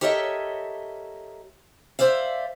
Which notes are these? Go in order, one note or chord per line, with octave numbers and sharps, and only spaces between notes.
G4 A4 A#4 C#5 D#5 E5
C5 D5 E5 F5